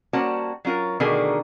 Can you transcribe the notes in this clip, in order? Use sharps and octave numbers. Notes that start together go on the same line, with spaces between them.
G3 A#3 C#4 F#4 C5 A5
F#3 C#4 F4 A#4
B2 D3 D#3 A3 G#4 A#4